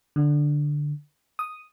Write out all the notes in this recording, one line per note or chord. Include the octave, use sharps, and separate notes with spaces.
D3
D#6